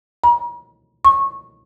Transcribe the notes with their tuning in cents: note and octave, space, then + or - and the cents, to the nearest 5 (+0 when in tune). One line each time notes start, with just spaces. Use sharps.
A#5 +45
C#6 -15